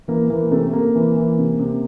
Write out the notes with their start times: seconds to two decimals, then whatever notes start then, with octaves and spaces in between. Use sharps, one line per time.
0.08 E3 A#3
0.30 E3 A#3
0.51 C3 A3
0.73 C3 A#3
0.95 E3
1.16 E3
1.38 C3
1.59 C3